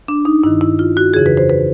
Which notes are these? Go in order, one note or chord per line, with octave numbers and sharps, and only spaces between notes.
D4
D#4
G2 D#3 E4
E4
F4
F#4
F2 C#3 E3 G#4
B4
C5
B4